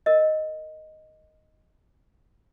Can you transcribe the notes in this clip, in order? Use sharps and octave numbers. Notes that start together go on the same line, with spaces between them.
A#4 D#5